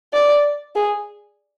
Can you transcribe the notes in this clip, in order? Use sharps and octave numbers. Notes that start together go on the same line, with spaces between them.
D5
G#4